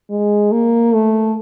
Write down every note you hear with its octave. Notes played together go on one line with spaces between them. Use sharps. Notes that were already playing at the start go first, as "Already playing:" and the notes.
G#3
A#3
A3